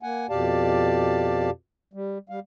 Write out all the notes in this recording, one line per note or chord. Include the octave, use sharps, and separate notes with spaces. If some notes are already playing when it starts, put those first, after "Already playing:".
A#3 F#5 G#5
F2 B2 G4 D5 F5 A5
G3
G3 F5